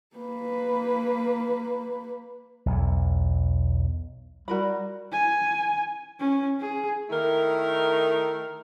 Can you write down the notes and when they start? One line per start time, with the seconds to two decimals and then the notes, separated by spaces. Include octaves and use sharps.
0.16 A#3 B4
2.66 B1 E2
4.48 G3 F#4 A#4 B5
5.12 G#5
6.20 C#4
6.60 G#4
7.10 D#3 A3 D#4 E4 A#4